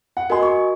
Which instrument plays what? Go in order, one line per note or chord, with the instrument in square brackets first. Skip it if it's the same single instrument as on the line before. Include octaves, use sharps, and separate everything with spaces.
[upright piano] F#5
[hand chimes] F#4 A#4 D#5 G#5 [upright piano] C6
[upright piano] C#6